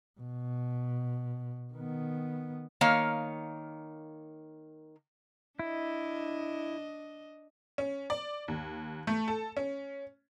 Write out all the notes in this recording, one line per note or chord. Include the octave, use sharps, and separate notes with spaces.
B2
D#3 B3
D#3 A#3 C#5 F5
D4 E4 D#5
C#4
D5
D#2
A3
A4
C#4